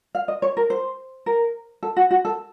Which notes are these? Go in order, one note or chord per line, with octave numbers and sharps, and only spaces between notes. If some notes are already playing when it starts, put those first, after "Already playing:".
F5
D#5
C#5
A#4
C5
A#4
A4
F#4
F#4
A4